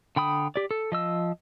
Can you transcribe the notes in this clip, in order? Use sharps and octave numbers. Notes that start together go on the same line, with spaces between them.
D3 G5 B5 D#6
G4 D5
A4
F3 D#5 E6